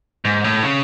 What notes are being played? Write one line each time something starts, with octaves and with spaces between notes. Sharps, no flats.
G#2
A2
C#3